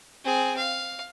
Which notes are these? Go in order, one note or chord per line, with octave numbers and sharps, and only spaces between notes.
C4 G#4
F5